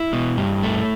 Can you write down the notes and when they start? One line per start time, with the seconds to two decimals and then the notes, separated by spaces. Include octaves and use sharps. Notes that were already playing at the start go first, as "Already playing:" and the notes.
Already playing: E4
0.13 B2
0.37 G2
0.63 A3